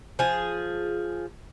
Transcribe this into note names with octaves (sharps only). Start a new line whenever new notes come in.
F3 G#4